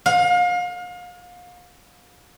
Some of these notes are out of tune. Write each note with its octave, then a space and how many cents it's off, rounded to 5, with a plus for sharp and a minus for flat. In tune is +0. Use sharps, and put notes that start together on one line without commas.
F5 +35